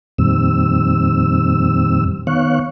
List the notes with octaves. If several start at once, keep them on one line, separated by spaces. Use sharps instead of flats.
F2 A#2 D#3 G3 C4 E6
D#3 B3 C#5 F5 C#6 F#6